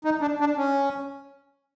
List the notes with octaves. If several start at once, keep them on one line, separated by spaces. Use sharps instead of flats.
D#4
D4
D4
C#4